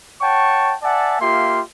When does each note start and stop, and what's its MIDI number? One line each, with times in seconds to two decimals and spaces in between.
0.21 0.74 73
0.21 0.74 78
0.21 0.74 79
0.21 0.74 81
0.21 0.74 85
0.82 1.19 74
0.82 1.19 76
0.82 1.19 78
0.82 1.19 80
0.82 1.19 81
1.20 1.60 58
1.20 1.60 65
1.20 1.60 67
1.20 1.60 76
1.20 1.60 84